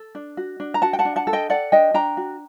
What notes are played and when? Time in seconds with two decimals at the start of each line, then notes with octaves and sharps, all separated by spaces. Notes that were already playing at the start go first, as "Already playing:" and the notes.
Already playing: A4
0.15 D4
0.37 F#4
0.60 D4
0.74 A#5
0.82 F#4 F#5 A5
0.93 G5
0.99 F#5 A5
1.05 D4
1.16 F#5 A5
1.27 A4
1.33 D#5 G5
1.50 A4 D5 F#5
1.72 D4 D#5 G5
1.94 D4 G5 A#5
2.17 F#4